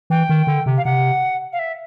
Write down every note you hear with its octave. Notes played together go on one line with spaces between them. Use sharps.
E3 G5
D#3
D3
C3
F5
C3 F#5
F5
E5